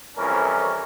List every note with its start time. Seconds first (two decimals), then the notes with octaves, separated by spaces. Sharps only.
0.17 C2 F2 E3 C#4 A#4